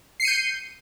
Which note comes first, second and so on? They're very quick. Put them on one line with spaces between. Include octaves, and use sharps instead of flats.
C7 C#7 D#7 G6